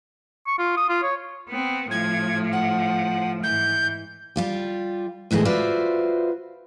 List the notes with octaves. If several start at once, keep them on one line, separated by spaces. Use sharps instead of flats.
C#6
F4
D#6
F4
C#5
B3 C4
A2 F3 G#6
F#5
G#2 E3 G6
G3 F4 G4
D2 A2 E3 G#3 D#5
F4 F#4 B4 C5 D5 E5